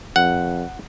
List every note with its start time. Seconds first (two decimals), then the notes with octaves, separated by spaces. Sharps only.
0.16 F2 F#5